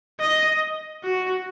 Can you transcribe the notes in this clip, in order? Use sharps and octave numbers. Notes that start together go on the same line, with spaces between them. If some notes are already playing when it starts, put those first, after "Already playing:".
D#5
F#4